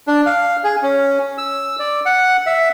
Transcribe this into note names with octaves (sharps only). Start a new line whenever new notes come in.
D4
F5
G#4
C#4
E6
D5
F#5
E5